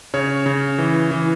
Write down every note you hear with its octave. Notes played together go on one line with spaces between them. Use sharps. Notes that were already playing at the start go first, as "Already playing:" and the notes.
C#3 C#5
C#3
E3
E3